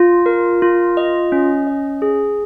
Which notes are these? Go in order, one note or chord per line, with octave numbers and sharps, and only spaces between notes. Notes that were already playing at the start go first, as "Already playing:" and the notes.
Already playing: F4
A#4
F4
D#5
C#4
D#5
G#4